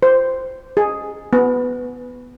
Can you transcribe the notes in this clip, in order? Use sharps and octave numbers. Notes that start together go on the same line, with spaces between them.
C5
G#4
B3